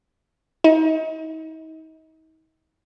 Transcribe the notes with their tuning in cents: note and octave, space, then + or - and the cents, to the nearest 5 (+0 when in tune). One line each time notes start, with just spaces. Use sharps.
D#4 +40